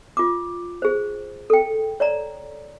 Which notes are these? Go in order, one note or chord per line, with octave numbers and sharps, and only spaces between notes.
F4 D6
G#4 C5
A4 G5
C#5 D5 A#5